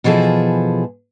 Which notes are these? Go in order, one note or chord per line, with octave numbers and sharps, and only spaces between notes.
B2 E3 F3 G#4 A4